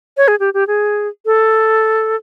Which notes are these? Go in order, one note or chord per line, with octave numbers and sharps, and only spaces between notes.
C#5
G#4
G4
G4
G#4
A4